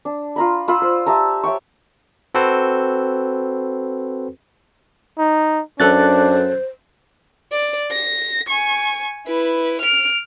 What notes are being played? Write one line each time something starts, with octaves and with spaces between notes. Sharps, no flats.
D4
F4 A#5 B5
F4 B5 E6
C5
G4 E5 A5 A#5
C#5 E5 G5 C#6
C4 F#4 A4 B4 C5
D#4
F#2 D4 A4 C5 F#6 A6
D5
A#6
G#5 C#6
E4 B4
F6 D7